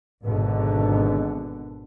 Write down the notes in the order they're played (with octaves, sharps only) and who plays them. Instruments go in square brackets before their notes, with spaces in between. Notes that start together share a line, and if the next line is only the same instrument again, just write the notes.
[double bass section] G#1 B2 D3 B3